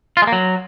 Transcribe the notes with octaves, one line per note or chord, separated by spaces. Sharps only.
F4
G#3
A#3
F#3